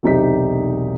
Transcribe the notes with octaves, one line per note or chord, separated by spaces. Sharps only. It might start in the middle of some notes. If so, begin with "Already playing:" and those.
E1 B1 C3 D#4 G4 B6